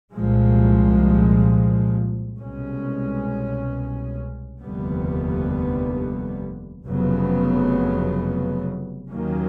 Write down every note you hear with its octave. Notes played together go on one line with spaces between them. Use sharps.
C2 A#2 F3 G#3
C2 B2 G#3 C#4
F1 D#2 D3 G3 B3
F1 F2 C#3 F#3 B3
D#2 D#3 F#3 A#3 C#4